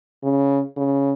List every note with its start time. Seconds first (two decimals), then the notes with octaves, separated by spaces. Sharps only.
0.23 C#3
0.77 C#3